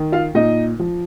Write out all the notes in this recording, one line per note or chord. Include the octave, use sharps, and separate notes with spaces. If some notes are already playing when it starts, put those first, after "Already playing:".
Already playing: D#3
F4 F5
A#2 D#4 D#5
F3